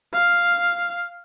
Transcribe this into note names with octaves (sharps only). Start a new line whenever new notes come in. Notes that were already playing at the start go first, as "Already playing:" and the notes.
F5